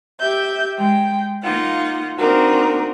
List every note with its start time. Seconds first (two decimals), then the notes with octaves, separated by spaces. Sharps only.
0.19 G4 E5 G6
0.78 G#3 G5
1.42 A#3 D#4 F4 F#5
2.18 A#3 C4 D4 D#4 F#4 A#4